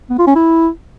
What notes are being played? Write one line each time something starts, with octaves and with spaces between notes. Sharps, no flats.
B3
F4
C#4
E4